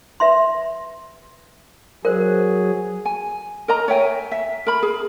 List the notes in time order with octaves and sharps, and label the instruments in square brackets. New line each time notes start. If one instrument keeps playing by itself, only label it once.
[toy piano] B4 E5 C6
[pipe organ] F#3 G#4 [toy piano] A#4 C5
[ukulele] G#5
A#4 D#5 A#5
C#5 E5 G5 G#5
E5
A#4 B5
G#4